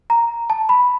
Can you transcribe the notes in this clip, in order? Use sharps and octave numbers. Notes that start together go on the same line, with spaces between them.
A#5
A5
B5